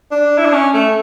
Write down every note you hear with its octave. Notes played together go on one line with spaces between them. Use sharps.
D4
E4
D4
C#4
A3